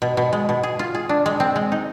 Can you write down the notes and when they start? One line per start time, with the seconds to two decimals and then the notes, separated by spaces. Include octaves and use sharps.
0.02 B2
0.17 B2
0.33 G#3
0.49 B2
0.63 G#4
0.79 F4
0.95 G#4
1.09 D4
1.26 G#3
1.40 C4
1.56 G#3
1.72 D#4